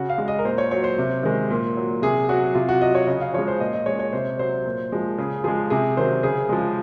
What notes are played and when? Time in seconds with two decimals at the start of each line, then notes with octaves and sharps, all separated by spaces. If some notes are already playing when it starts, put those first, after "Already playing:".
Already playing: C#3 F#4
0.10 F5
0.18 G#3
0.28 D#5
0.39 A#4
0.45 A#2 C5
0.58 C#5
0.71 F#3 C#5
0.84 C5
0.98 C3
1.23 D#3 G#3
1.50 A#2
1.77 F#3
2.02 C3 G#4
2.29 F#3 F#4
2.55 C3 F4
2.69 F#4
2.81 F#3 D#5
2.95 C#5
3.07 C#3 D#5
3.21 F5
3.34 F3 G#3 C#5
3.48 C5
3.60 A#2 D#5
3.74 D#5
3.86 G#3 C#5
3.99 C#5
4.13 C3 C5
4.39 F#3 C5
4.66 A#2
4.92 F3 G#3
5.18 C#3 G#4
5.44 F3 G#3 G#4
5.70 C3 G#4
5.97 D#3 F#3 C5
6.23 C#3 G#4
6.49 F3 G#3